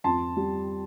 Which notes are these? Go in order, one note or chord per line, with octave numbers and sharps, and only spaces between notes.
F2 A5 C6
G3